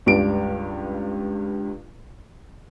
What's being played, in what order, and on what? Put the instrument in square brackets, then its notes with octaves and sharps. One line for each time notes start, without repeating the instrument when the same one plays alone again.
[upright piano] C#2 G2 D4 D7